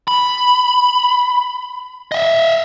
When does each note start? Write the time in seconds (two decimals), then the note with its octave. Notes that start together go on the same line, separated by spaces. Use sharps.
0.08 B5
2.12 D#5 E5